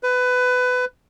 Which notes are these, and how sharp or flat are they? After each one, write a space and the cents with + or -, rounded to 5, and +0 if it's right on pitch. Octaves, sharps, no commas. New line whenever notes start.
B4 +20